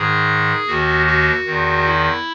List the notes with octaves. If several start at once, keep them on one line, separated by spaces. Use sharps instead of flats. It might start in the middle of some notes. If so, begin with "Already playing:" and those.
Already playing: G#2 D#3 G#4
D#2 D#3 F#4
F#4
E2 D#3
E4